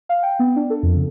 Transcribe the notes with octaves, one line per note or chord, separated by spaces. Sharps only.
F5
G5
B3
D4
A4
F2
C#3